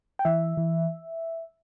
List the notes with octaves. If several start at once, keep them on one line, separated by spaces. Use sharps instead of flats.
G5
E3 E5
E3